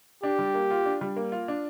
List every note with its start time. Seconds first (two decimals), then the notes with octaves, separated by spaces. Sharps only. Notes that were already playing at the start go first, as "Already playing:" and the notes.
0.23 D4 G4
0.39 G3
0.54 A#3
0.71 F4
0.86 D4
1.01 G3
1.16 A#3
1.32 F4
1.48 D4